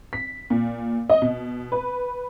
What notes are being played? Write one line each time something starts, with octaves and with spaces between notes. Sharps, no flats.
B6
A#2
D#5
B2
B4